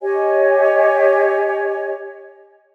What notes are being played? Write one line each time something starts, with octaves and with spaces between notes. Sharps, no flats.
G4 C#5 D#5 G#5